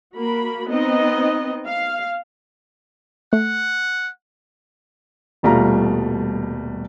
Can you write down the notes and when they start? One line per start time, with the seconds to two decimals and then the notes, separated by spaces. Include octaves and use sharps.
0.15 A#3 F#4 A#4 B5
0.68 B3 C4 D#4 D#5
1.66 F5
3.33 A3 F#5
5.43 D#1 B2 G3 A3 F4 A#5